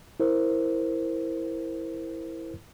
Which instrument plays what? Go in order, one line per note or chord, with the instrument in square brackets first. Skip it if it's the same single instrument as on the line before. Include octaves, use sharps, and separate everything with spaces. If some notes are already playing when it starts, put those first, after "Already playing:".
[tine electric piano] E4 A#4 C5